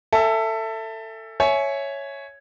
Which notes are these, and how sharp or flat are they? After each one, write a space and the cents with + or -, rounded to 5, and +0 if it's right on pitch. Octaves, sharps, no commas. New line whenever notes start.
A4 +20 E5 +5 G#5 +0
C#5 +0 E5 +0 G#5 +25